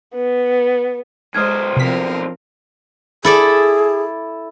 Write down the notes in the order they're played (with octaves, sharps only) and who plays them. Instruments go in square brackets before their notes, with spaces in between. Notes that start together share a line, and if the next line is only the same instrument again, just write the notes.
[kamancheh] B3
[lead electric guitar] B1 C5 [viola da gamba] G#3 [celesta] D#6 F6 G#6
[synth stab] C3 B6 [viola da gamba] F3 C4 A#4
[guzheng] E4 A4 D5 [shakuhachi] G#4